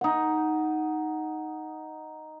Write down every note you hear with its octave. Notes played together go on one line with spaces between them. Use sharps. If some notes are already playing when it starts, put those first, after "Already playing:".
D#4 F#5